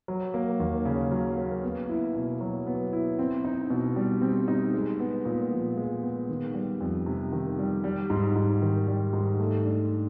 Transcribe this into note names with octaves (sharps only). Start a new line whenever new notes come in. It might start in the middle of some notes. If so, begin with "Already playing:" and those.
F#3
A#3
D#2
C#3
F#3
A#3
B3
E4
B2
F#3
B3
E4
C4
D#4
B2
G3
C4
D#4
G#3
B3
A#2
F3
G#3
B3
D#3
G3
F2
C3
D#3
G3
G3
G#2
G#2
D#3
G3
G#2
A3
D4